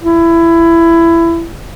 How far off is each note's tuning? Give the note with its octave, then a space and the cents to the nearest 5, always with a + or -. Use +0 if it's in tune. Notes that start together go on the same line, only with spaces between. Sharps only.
E4 +20